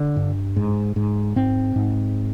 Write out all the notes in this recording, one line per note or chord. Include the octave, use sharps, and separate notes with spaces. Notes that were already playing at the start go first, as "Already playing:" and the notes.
Already playing: D3
G2
G#2
G#2
G#2 C4
G#2